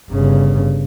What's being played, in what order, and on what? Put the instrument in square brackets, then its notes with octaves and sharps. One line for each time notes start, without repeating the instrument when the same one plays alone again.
[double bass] G1 C#3